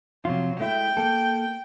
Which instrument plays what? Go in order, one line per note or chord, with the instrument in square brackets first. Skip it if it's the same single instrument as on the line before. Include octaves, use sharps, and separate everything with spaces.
[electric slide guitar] C3 F3 F4 [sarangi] F#3
[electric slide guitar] G#3 A3 E4 [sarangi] G5
[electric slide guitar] A#3 A4